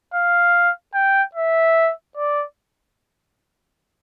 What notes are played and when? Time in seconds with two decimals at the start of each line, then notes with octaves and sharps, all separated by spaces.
0.14 F5
0.94 G5
1.35 E5
2.17 D5